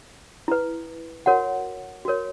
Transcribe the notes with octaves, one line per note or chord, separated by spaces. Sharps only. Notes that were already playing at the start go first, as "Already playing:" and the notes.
E4 B4
F#4 A#4 C#5 F#5
F#4 A#4 C#5